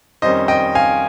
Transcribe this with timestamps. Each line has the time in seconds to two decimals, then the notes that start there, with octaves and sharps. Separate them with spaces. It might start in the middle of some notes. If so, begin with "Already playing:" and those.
0.22 F2 D#3 G3 C#4 C5 D#5
0.48 D#5 G5
0.75 F5 G#5